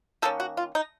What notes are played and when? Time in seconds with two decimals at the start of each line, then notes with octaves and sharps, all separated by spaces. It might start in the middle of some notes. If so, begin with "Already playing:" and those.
0.22 D#3 A#3 C#4 A4
0.40 F#4
0.57 F4
0.75 D#4